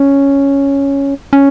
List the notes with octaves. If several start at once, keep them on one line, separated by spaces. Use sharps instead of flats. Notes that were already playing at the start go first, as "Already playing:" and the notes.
Already playing: C#4
C#4